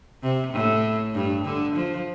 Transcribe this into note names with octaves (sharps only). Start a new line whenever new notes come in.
C3
A2
G2
D3
F3